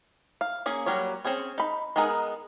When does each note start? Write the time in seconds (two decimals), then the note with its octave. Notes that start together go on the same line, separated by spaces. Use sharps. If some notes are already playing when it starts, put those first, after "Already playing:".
0.41 F5
0.66 A#3 C#4 G#4
0.86 F#3 G3 A#3 C#5
1.25 C4 C#4 G#4 C#5
1.58 D#4 B5
1.96 G#3 B3 D#4 G#4 A#4